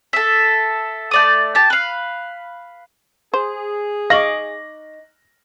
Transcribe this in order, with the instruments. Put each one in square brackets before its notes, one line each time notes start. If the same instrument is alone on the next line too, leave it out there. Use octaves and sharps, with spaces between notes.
[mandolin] A4 E5
A3 D5 D#6
G4 A5
B4 F5
[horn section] G#4 [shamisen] C5
[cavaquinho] D#4 C#6 D6 [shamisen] F5 [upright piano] A#6 F#7